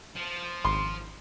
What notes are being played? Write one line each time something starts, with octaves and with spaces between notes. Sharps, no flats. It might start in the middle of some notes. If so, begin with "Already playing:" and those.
F3
G#1 C6